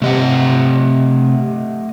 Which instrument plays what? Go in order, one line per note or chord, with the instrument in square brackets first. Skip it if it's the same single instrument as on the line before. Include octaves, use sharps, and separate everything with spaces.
[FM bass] C3 [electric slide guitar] A3 D#5 F#5